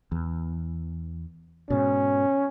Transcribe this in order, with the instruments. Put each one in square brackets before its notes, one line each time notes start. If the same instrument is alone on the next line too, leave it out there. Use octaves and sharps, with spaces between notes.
[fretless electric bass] E2
[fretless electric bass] G#2 B2 [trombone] C#4